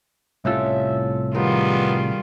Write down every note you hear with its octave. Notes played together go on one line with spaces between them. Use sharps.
C2 A2 C#4 F4 G4 A4 E5
D#3 G3 G#3 B3 F4 G4 A#4